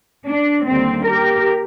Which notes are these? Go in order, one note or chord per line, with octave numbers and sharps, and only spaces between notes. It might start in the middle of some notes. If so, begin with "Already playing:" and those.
D4
D#2 D3 G3 A#3 C4
G4 A#4